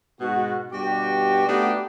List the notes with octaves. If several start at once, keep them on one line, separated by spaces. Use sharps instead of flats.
G#2 B2 F#4
G2 B2 F#4 G4
A3 B3 D4 D#4 F#4 G4